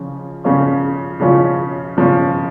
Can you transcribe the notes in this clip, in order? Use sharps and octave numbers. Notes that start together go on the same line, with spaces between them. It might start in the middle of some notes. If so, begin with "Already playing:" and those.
Already playing: C#3 F3 C#4 F4
C#3 F3 C#4 F4
C#3 F3 C#4 F4
C#3 F3 C#4 F4